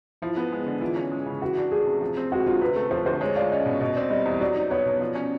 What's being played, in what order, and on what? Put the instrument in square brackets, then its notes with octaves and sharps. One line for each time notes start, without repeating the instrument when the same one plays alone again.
[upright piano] F3 [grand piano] E4
[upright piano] B3
G#3
D3
[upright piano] E3 [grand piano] F4
[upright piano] C#4
G#3
C#3
[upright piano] E3 [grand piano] F#4
[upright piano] D4
[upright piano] A3 [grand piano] G#4
[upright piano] C3
F3
C4
[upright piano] G#3 [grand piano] F#4
[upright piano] D3 [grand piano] F4
[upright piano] C3 [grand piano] B4
[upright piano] A3
[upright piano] F3 [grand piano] C5
[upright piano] D2 [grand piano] C5
[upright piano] G#3 [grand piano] C#5
[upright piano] F4 [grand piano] D5
[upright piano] C#4 [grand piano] D#5
[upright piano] B2
[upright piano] B2 [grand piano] D#5
[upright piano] C4 [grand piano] D5
[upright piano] G3 [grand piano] D#5
[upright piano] E2
[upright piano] F#3 [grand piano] D5
[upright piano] D#4
[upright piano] B3 [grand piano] C#5
[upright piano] B2
F3
C#4